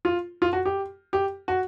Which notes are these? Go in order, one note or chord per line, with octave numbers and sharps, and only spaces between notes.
F4
F4
F#4
G4
G4
F#4